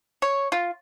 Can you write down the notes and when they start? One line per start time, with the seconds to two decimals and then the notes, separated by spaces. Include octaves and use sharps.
0.22 C#5
0.52 F4